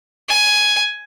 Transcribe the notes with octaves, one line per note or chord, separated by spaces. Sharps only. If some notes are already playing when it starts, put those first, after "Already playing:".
G#5